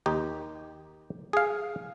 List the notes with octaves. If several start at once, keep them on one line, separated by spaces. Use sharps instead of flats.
D#2 D#4 G4
G#4 F5